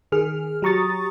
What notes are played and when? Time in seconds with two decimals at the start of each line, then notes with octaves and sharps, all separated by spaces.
0.12 D#3 G#4 F6
0.62 F#3 G4 A#5 C#6 D#6 A6